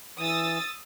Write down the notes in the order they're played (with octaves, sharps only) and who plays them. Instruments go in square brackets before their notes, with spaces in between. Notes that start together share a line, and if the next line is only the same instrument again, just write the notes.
[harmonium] E3 [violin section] D#6 E6 A6